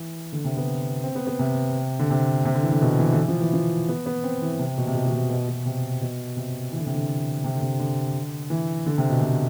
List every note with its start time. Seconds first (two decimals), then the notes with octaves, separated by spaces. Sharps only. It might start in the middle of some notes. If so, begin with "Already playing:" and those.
Already playing: E3
0.32 D3
0.44 C3
0.57 B3
1.04 C4
1.15 B3
1.27 B3
1.39 C3
1.99 D3
2.10 C3
2.45 C3
2.55 D3
2.63 E3
2.72 D3
2.82 B2
2.99 E3
3.13 D3
3.17 E3
3.28 F3
3.41 E3
3.53 F3
3.89 B3
4.06 B3
4.24 C4
4.42 E3
4.59 C3
4.78 B2
4.87 C3
4.95 B2
5.07 B2
5.13 C3
5.30 B2
5.48 B2
5.66 C3
6.02 B2
6.37 C3
6.72 E3
6.79 D3
6.86 C3
6.94 D3
7.44 C3
7.55 D3
7.62 C3
7.79 D3
8.50 E3
8.87 D3
8.98 C3
9.10 B2
9.21 C3